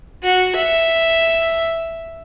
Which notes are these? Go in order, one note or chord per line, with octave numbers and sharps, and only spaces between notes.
F#4
E5